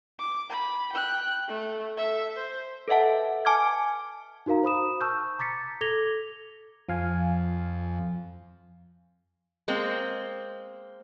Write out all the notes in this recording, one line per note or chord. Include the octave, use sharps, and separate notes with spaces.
D6
B5
G5 F#6
A3
A4 E5
C5
A4 B4 D#5 E5 F#5 A5
G#5 A5 D6 F6 G#6
D#4 F#4 A#4 F5 A#5
C5 B5 D#6 E7
A5 C#6 E6 F6 G6
A#5 D6 A6 B6 C#7
A4 D6 G#6 A#6 F7 G7
F2 F3 F5 G#5
G#3 A#3 C4